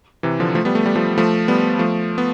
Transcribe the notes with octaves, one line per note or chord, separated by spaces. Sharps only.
C3 E3
D3 F3
F3 A3
G3 B3
A3
G3
F3 A3
F3 A3
G3 B3
F3 A3
B3